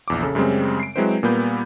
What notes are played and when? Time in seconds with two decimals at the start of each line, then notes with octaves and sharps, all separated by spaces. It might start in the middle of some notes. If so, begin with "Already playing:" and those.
0.08 A#1 E2 D6
0.23 C#3 A4
0.35 F#2 C#3 G3 G#3 C4
0.80 C7 D7
0.96 F#3 G#3 C4 E4 B4 C5
1.23 A#2 G3 A#3 B3 B5 G6